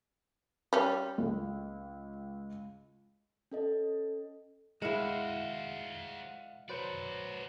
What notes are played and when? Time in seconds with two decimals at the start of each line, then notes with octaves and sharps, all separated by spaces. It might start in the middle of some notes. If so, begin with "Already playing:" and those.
0.73 G3 C#4
1.18 C#2
3.52 C#4 A4 D#5
4.82 G#3 E4 F#4 C5 D#5 F5 F#5
6.69 F#3 F#4 B4 C5 D5